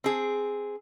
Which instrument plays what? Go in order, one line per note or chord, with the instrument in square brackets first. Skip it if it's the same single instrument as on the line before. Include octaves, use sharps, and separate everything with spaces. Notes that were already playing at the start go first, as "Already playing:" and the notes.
[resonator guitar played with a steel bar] C4 G#4